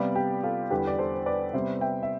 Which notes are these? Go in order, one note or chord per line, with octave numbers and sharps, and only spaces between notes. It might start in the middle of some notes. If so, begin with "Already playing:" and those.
Already playing: C3 G3 B3 D5 F5
G4
F4 A4
E2 D3 G3 G4 B4
D5
A4 C5
C5
B4 D5
C3 G3 B3 C5 E5
E5 G5
E5